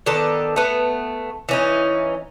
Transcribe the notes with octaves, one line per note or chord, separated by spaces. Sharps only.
D#3 B3 D4 A4
A3 B3
E3 C#4 D#4